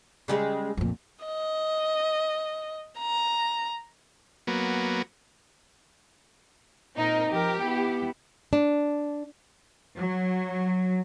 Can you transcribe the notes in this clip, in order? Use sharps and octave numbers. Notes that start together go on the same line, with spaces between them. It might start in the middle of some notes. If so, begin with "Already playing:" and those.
C#3 G3 G#3
F2 A#2
D#5
A#5
F#3 A#3 B3
A#2 C4 D#4 A#4
F3 G4 A#4
B3 E4
D4
F#3